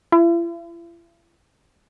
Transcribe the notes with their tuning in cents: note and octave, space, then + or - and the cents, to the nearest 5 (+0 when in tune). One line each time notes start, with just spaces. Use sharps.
E4 +45